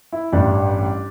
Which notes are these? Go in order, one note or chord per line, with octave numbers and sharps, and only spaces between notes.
E4
A1 G2 G3 D4 G4